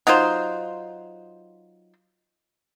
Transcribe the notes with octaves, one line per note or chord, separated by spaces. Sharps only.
F#3 D#4 F4 C5